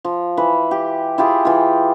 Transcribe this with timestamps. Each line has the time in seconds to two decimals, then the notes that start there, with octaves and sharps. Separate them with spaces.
0.04 F3
0.37 E3 B4
0.71 G4
1.18 E4 F4 G4 G#4
1.45 E3 F4